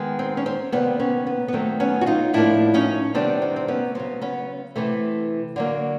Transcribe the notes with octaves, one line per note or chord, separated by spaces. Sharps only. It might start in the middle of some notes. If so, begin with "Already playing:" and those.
Already playing: D#3 G#3 B3
C4
C#4
C4
C3 D#3 G3 A#3 B3 C#4
B3 C#4
B3
B3
D#3 F#3 A3 C4
B3 C#4
F#4
D#4 F4
A2 F3 A#3 D4 E4
C#4 D#4
C3 D#3 G3 B3 C4 D4
C4
C4
B3 C#4
C#3 F#3 B3 C4
B3 C#4
C3 E3 A3
D3 F#3 A#3